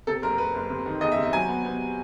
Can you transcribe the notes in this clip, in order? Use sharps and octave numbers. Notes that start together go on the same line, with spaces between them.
C3 A4
F#1 A#4
F#1 B4
F#1
C3
D#3
E2 D#5
E5
C3
E5
F#3 G#5
B3
B3